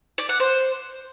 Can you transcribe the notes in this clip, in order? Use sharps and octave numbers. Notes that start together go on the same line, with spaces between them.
D5
F#5
C5